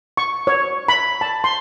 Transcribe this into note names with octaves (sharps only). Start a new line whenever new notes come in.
C#6
C#5
B5
A5
C6